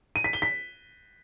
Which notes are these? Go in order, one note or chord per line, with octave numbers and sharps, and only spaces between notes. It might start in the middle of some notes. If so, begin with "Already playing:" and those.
D#7
B6
G7
B6